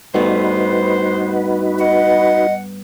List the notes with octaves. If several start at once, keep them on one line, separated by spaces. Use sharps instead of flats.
G2 A3 B3 D#4 F#4 B4 C5
D#5 F#5